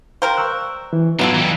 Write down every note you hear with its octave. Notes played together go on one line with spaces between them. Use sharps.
G3 A#4 C5 F5
C#6 E6 F#6
E3
A2 F#3 B3 D4 D#4 F4 A4
E3 G3